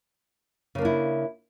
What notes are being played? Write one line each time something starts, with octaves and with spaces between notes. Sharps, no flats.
C#3 A#3 D4 E4